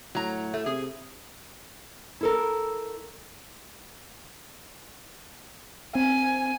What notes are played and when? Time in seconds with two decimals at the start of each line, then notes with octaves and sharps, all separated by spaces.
0.15 A2 F#3 A#5
0.54 A3
0.66 C3 G#4
2.21 E4 A4 A#4
5.95 C4 G#5